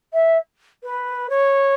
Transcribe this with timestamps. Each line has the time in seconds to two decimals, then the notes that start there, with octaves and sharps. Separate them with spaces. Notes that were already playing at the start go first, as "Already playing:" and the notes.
0.13 E5
0.83 B4
1.30 C#5